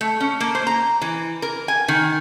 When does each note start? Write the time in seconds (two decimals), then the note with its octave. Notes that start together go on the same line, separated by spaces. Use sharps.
0.01 A3
0.20 C#4
0.40 A#3
0.55 C5
0.67 A#5
1.02 E3
1.42 A#4
1.68 G#5
1.88 D#3